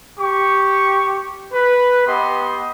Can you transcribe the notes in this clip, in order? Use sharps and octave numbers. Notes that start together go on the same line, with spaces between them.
G4 C#6
B4
B3 G4 D#5 C6